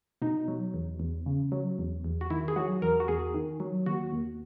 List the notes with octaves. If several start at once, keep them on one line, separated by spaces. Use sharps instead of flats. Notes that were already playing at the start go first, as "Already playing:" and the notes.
B2 D#4
F#3
E2
E2
C#3
F#3
E2
E2
F#4
D#3 E4
G#4
F#3 F#4
E2 A#4
F#4
E2 G#4
D#3
F#3
D#2 F#4
D#2